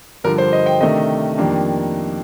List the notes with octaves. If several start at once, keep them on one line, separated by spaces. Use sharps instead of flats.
G2 D3 F3 A#4
C5
D#5
G5
C3 D#3 A3 D4 D#5
F2 D#3 G3 A#3 D4